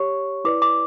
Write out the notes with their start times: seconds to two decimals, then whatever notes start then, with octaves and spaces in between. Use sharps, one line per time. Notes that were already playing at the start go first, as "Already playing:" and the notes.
Already playing: G4 C#5 C#6
0.45 E4 B4 D5 D6
0.62 D6